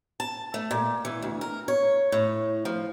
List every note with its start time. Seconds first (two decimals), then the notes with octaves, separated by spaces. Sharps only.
0.20 A5
0.54 A3
0.71 A#2
1.05 E3
1.22 D2
1.41 A#4
1.68 C#5
2.12 A2
2.65 F3